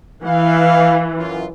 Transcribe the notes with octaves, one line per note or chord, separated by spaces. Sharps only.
E3 F5
F#2 F4